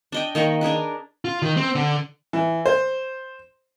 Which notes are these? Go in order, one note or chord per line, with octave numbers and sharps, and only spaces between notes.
D4 D#5 G5
D#3 A#3 D#5 C#6
D4 G#4 A#4 B4
F4
D#3
C4
D3
E3
C5